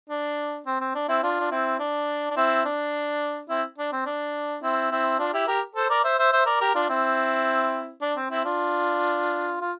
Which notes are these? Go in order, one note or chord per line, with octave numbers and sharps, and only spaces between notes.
D4
C4
C4
D4
C4 E4
D4 F4
D4
C4 E4
D4
D4
C4 E4
D4
C4 E4
D4
C4
D4
C4 E4
C4 E4
D4 F4
E4 G4
G4 A#4
A4 C5
A#4 D5
C5 E5
C5 E5
C5 E5
A#4 D5
G4 A#4
D4 F4
C4 E4
D4
C4
C4 E4
D4 F4
F4